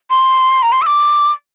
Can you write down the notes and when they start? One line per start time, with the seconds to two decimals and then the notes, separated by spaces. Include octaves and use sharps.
0.10 C6
0.62 A#5
0.72 C6
0.82 E6
0.86 D6